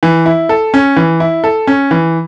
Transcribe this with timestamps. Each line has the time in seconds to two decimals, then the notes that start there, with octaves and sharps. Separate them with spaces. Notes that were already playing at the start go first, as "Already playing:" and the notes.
0.03 E3
0.26 E4
0.49 A4
0.74 C#4
0.96 E3
1.20 E4
1.44 A4
1.67 C#4
1.91 E3